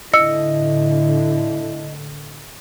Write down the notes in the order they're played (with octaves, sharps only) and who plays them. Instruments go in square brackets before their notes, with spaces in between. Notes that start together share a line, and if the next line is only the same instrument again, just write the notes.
[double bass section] A2 D3 [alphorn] E4 [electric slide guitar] D#5 [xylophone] E6 C#7